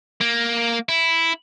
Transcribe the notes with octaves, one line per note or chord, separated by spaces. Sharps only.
A#3
E4